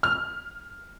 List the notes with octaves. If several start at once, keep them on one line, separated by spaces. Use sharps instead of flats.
F6